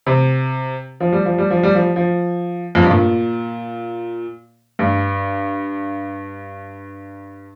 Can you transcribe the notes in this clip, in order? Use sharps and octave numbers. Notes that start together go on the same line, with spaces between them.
C3
F3
G3
F3
G3
F3
G3
F3
F3
F2
G2
A#2
G2